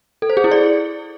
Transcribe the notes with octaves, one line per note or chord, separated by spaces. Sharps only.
A4
C5
G#4
E4
D5